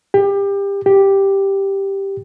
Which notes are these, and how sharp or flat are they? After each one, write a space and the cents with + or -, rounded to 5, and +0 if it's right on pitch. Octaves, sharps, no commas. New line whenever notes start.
G4 +25
G4 +0